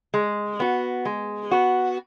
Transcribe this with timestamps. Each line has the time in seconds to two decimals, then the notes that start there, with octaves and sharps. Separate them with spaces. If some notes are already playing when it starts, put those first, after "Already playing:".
0.14 G#3
0.60 B3 F#4
1.05 G#3
1.51 B3 F#4